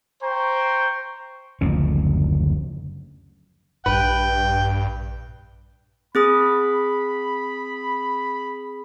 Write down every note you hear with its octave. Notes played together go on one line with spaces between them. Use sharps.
C5 G5 A#5 C#6
F#1 D2 F3 C#4
A#1 G2 B4 G5
C4 G#4 B5 D#6